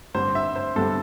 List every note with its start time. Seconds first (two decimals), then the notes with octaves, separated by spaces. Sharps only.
0.14 G2 D3 G3 C4 C5
0.35 E5
0.56 C5
0.76 G2 D3 G3 C4 A4